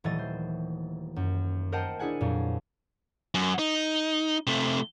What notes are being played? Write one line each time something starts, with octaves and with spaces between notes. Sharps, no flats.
D#1 E3 F#3 A3 D#5 A6
C5
F#2
A#4 C5 D#5 F#5 G5 A5
D4 E4 G#4 F#5 G#5
F2 A#2 F#3
F#2
D#4
C3 A3